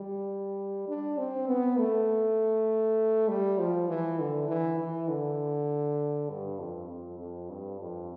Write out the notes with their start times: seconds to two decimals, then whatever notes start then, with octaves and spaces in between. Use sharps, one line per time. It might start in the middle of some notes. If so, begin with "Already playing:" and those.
Already playing: G3
0.88 D4
1.18 C4
1.48 B3
1.78 A3
3.28 G3
3.58 F3
3.89 E3
4.19 D3
4.49 E3
4.79 E3
5.08 D3
6.29 G2
6.59 F2
6.89 F2
7.19 F2
7.49 G2
7.80 F2